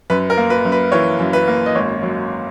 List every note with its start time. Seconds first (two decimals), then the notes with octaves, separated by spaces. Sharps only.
0.10 F#2 B4
0.30 A#4
0.37 A#3
0.50 B4
0.65 F#2
0.72 B4
0.92 E3 C#5
1.19 F#2
1.33 B4
1.48 A#3
1.66 D#5
1.75 G#1 C#5
2.03 F#3